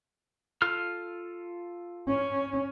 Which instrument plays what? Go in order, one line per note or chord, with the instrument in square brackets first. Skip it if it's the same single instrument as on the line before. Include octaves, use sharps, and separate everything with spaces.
[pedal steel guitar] F4 A4 F6
[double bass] C#4